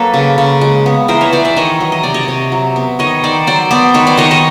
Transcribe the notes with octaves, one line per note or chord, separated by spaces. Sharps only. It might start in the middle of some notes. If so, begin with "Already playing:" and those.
Already playing: F#3 A#3 A4 B4
C#3
C#3
G#3
B3
E3 A#4 C5
B4 C#5
E3 C5 D5
D5 E5
D#3 C#5 D#5
F#3
D#5
C3 D5
C#5 D#5
C3
F#3
B3
D#3 C#5 D#5
D#3 C5 D5
F#3 C5 D5
B3 C5 D5
D#3 B4 C#5
C5 D5
D#3 C#5 D#5
C#5 D#5